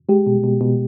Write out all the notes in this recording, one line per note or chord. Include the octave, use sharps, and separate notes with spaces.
G#3 G4
B2
B2
B2